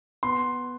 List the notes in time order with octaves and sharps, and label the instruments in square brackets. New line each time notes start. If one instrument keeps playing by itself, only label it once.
[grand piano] B3 C6